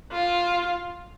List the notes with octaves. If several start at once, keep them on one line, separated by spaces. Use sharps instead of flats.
F4